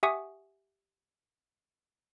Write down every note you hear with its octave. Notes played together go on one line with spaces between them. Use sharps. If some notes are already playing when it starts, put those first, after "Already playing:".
G4 E5 F#5 G#5 C#6 D#6